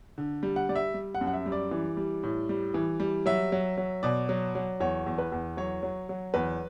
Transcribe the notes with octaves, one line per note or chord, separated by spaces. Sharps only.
D3
G3
F#5
G3 D5
E5
G3
F#5
F#2
F#5
E5
G3
D5
E3
G3
A2
G3
E3
G3
F#3 E5
F#3
F#3
B2 D5
F#3
F#3
E2 C#5
E2
B4
E2
F#3 C#5
F#3
F#3
E2 B4